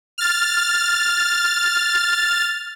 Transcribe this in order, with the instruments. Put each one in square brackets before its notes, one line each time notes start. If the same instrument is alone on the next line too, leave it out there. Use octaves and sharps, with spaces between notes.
[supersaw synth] F6 A6